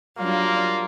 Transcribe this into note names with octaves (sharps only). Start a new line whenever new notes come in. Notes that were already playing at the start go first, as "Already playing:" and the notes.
F#3 G3 A#3 D4 F4